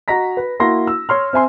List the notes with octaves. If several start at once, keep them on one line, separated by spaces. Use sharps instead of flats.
F#4 D#5 A#5 A#6 B6
B4
A#3 E4 F#4 C6 A#6
E6
C#5 C6 F6
C4 E5 G#5 C6